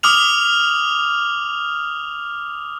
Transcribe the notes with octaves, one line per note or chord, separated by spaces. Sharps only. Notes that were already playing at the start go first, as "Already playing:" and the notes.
D6 D#6 F6 F7